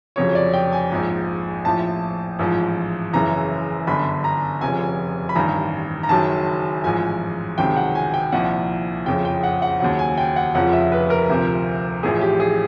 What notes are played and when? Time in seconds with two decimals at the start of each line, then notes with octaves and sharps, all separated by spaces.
0.16 F1 F2 C#3 F#3 C#5
0.35 D5
0.53 G5
0.73 G#5
0.90 A#1 G#2 F3
1.65 A#1 A2 F3 A5
2.39 A1 G#2 F3
3.13 F#1 F#2 C#3 E3 A#5
3.87 G1 F#2 D3 B5
4.24 A#5
4.61 F1 F2 C#3 G#5
5.29 B5
5.35 A1 G2 D#3 A#5
6.03 A#5
6.09 F#1 F#2 D#3 F#3 A5
6.83 A1 G#2 F3 G#5
7.58 C#2 C3 D#3 F#3 G5
7.76 F#5
7.95 G#5
8.14 G5
8.32 C2 A#2 F3 F#5
9.06 F#1 F2 C#3 F3 G5
9.25 G5
9.43 F#5
9.62 F#5
9.80 D#2 C#3 F#3 F#5
9.99 G#5
10.18 G5
10.36 F#5
10.55 F1 F2 C#3 F3 F#5
10.73 E5
10.92 B4
11.10 A#4
11.29 D2 C3 F3
12.03 A1 A2 F3 G#4
12.21 G4
12.40 G#4